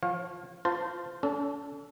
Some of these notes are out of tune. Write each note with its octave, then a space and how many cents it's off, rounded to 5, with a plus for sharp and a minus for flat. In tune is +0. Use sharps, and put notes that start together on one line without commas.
F3 +0 C#5 -35 F5 +20
F4 +0 C5 -20 A5 +20
C#4 +45 A4 +0